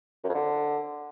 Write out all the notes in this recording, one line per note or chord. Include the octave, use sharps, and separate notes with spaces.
F#2
F2
D3